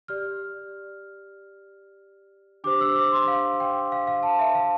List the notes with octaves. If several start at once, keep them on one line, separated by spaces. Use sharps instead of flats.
G4 D5 F6
D4 G4 C5 D6
E6
D6
C6
F5
G5
F5
F5
A5
E5
F5